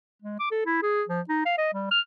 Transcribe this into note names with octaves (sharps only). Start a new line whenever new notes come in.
G#3
D6
A4
E4
G#4
F3
D#4
F5
D#5
G3
F6